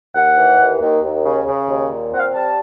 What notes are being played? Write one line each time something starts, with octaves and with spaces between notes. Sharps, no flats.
D#2 F#5
E3
D#2
D#2
D#2
C#3
C#3
D#2
A#2
C4 F#5
F5
G3 A5